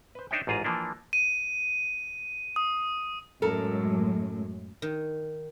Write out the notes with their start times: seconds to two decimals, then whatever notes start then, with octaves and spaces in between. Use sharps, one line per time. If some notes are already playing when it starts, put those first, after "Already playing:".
0.15 B4 C5
0.31 D4 D#4 C5 C#5 E5 G5
0.47 A1 G#2 F4 G#4 A#5
0.64 E3 F3 A#3 D4
1.13 D#7
2.56 D#6
3.42 F#2 A2 G#3 A4 A#4
4.82 D#3